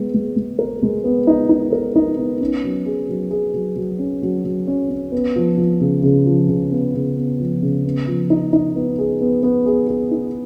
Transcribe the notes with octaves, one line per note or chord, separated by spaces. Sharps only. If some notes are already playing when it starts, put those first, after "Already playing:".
Already playing: G#3 B3
G#3
G#3
A#4
G#3
B3
D#4
D#4
A#4
D#4
B3
C#4
F#3
G#4
F#3
G#4
F#3
F#3
C#4
F#3
F#3
C#4
C#4
B3
F3
F3
C#3
C#3
F3
C#3
B3
C#3
B3
F3
C#3
B3
F3
D#4
D#4
B3
G#4
B3
B3
G#4
G#4
D#4